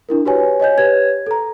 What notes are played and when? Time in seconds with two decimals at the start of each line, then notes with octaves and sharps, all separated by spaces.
0.09 D4 E4 A#4
0.25 F#4 G4 B4 C#5 G#5
0.60 C#5 D#5 G#5 G6
0.78 G4 B4 C#5 G#6
1.27 A4 A#5